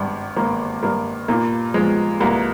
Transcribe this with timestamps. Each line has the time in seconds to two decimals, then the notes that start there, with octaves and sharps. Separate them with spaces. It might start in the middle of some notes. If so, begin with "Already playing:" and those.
Already playing: G#1 G2
0.36 G#1 A#3
0.83 G2 A#3
1.28 A#2 A#3
1.74 F3 G#3
2.20 C2 A#3